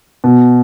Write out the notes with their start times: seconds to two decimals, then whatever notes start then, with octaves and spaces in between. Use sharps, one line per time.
0.24 B2